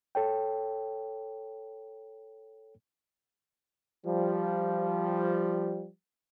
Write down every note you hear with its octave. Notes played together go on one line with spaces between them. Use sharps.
A4 C#5 G5
F3 G3